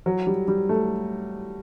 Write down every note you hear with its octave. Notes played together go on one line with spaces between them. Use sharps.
F#3
G3
G3
A3